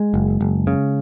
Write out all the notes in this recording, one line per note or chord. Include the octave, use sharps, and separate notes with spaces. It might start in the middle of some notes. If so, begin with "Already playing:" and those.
Already playing: G#3
F#1
F#1
C#3